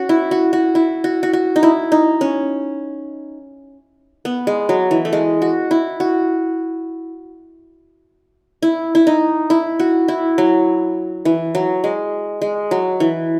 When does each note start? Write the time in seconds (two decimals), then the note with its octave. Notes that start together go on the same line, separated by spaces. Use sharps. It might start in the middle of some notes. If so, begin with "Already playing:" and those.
Already playing: C#4 F#4
0.09 E4
0.31 F#4
0.53 F#4
0.75 E4
1.04 F#4
1.23 F#4
1.33 F#4
1.56 D#4
1.63 E4
1.92 D#4
2.21 C#4
4.25 B3
4.47 G#3
4.69 F#3
4.91 E3
5.05 A3
5.13 G#3
5.42 F#4
5.71 E4
6.00 F#4
8.62 E4
8.95 E4
9.07 D#4
9.50 E4
9.80 F#4
10.08 E4
10.38 F#3
11.25 E3
11.55 F#3
11.84 G#3
12.42 G#3
12.71 F#3
13.00 E3